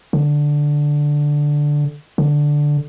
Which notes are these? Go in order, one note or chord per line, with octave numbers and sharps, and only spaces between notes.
D3
D3